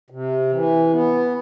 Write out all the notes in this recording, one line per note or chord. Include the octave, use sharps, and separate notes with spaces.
C3
E3
B3